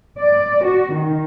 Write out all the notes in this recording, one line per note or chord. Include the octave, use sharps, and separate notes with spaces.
D5
F#4
D#3